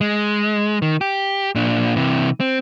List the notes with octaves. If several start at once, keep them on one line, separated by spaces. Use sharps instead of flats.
G#3
D#3
G4
A#2 D4
C3 E3
C4